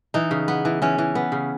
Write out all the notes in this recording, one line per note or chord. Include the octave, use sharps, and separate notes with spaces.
E3 D#4
C#3
B3
E3
E3 C#4
E3
B3
C#3